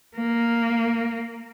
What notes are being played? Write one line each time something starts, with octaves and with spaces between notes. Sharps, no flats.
A#3